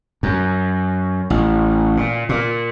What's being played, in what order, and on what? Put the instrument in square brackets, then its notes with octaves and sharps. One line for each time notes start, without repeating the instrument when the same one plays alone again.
[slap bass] F#2
A1
A#2
A#2